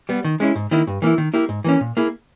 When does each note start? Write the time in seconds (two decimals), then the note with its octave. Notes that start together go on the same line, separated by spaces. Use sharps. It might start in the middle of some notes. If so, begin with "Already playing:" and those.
0.09 G3 B3
0.24 D#3
0.40 G#3 C#4 E4
0.56 G#2
0.71 D#3 A#3 E4
0.87 G2
1.02 E3 A#3 E4
1.18 D#3
1.34 A#3 E4 G4
1.49 G#2
1.64 E3 A#3 C#4
1.81 A#2
1.97 A#3 E4 G#4